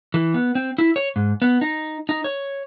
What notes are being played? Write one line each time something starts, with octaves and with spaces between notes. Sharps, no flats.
E3
B3
C4
E4
C#5
G#2
B3
D#4
D#4
C#5